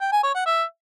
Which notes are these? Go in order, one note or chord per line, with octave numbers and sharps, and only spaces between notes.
G5
G#5
C#5
F#5
E5